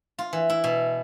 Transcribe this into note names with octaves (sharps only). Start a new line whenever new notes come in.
F4
E3
E4
B2